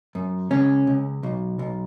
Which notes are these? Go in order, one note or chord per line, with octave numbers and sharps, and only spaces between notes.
F#2
C#2 C#4
C#2
B1
B1